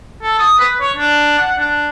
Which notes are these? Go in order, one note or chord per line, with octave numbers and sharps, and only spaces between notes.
A4
D#6
B4
C#5
D4
F#5
D4